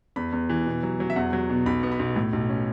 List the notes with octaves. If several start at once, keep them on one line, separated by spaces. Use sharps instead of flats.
E2 B5
E2
E3
B2
F#3
F#3
E5
E2 F#5
F#3
B2
B1 B5
B3
B5
B1
A2
B1
C#4